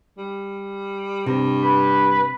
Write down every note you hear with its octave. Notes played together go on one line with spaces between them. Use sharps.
G3
G2 C3
B4